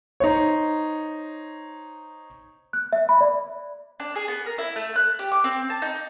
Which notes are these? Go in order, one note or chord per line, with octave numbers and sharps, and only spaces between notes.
D#4 C5 C#5
F#6
E5
B5
D5
D4
G#4
B3
A#4
E4
A3
F#6
G4
D6
C4
A5
D#4